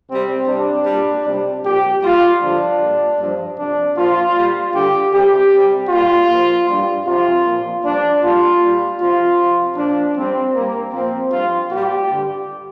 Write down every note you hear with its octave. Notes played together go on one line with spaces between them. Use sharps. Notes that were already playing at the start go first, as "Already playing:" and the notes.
C3 G3 C4
C3 G3 D4
A#2 G3
C3 G3
A#2 F3 G4
A#2 G3 F4
G2 D3 F3 D4
A#2 G3
G2 F3
C3 F3 D4
A#2 F3 F4
A#2 G3
G2 D3 G3 G4
C3 G3 G4
C3 G3
A#2 G3 F4
A#2 F3
G2 G3
C3 F3 F4
A#2 F3
G2 F3 D4
A#2 G3 F4
A#2 G3
C3 F3 F4
C3 F3
A#2 F3 D4
G2 G3 C4
G2 G3 A#3
A#2 F3 C4
G2 F3 F4
A#2 G3 G4
G2 D3 G3